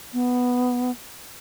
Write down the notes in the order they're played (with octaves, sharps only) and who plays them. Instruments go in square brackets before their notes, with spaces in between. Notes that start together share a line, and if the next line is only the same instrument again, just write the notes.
[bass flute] B3